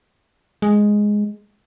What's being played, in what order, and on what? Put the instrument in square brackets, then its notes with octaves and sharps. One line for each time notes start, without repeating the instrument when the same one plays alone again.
[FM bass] G#3